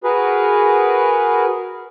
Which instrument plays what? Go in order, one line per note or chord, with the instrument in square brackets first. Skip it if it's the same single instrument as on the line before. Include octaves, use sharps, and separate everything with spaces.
[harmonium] F#4 G#4 A#4 B4